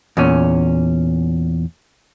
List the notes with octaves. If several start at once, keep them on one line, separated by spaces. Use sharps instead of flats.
E2 A#2 C#4